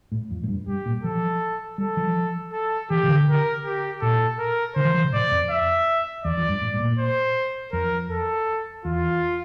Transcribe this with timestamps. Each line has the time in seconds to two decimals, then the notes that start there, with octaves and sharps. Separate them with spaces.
0.12 A2
0.31 F2
0.43 A2
0.48 G2
0.67 G2 G4
0.86 A#2
1.04 F3 A4
1.78 G3 A4
1.97 F3
2.52 A4
2.90 E3 G4
3.03 C3
3.08 D3
3.28 A#4
3.65 G4
4.02 A#2 A4
4.39 A#4
4.76 D3 C5
4.85 E3
4.94 F3
5.04 C3
5.13 A2 D5
5.31 F2
5.50 E5
6.24 E2 D5
6.37 F2
6.49 G2
6.61 A2
6.74 A2
6.80 A#2
6.99 C5
7.72 F2 A#4
8.10 A4
8.85 E2 F4